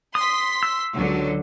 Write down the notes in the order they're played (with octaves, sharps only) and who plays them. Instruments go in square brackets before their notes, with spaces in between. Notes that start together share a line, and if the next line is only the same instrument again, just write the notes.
[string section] C6 B6 [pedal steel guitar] D#6
[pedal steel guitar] E6
[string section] C#2 D3 F#3